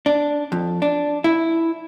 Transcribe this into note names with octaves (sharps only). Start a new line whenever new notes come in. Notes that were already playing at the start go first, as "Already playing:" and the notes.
D4
F2
D4
E4